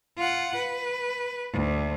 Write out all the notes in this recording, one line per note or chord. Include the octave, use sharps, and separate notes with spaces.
F4 F#5
B4
D2